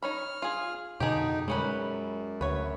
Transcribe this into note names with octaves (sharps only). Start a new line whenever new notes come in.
D#4 C#5 B5 F6
F4 G#4
F2 B2 D3 D#4 G4 G#4
F#2 G3 G#3 C#4 B4
D2 B4 C#5